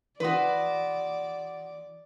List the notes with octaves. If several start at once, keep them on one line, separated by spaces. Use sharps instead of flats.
E3 F#4 B4 D5 C6 D#6